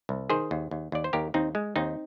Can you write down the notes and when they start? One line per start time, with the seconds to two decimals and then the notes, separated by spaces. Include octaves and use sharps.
0.09 C2
0.30 D#3 G#4 C5
0.51 D#2
0.71 D#2
0.92 D#2 D5
1.04 C5
1.13 D#2 G4 A#4
1.34 D#2 C4 D#4
1.55 G#3
1.76 D#2 C4 D#4